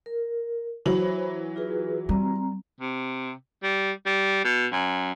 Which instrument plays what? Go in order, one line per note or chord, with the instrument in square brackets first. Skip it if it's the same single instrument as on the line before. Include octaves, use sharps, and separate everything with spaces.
[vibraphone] A#4
[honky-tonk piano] E3 F#3 F#7 [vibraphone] C5 C#5 B5
[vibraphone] F4 G#4 B4
[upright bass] G3 [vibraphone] C4 A#5
[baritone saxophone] C3
G3
G3
B2
F#2